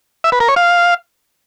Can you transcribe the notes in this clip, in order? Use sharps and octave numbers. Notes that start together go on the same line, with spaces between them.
E5
B4
A#4
C#5
F5